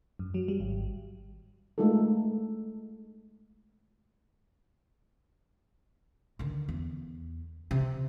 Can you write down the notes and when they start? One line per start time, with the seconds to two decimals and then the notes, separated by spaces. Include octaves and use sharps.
0.19 F#2
0.34 F#3
0.48 G3
0.60 G#1
1.78 G#3 A3 D#4 F4 A4
6.39 D3 D#3
6.69 E2
7.71 C3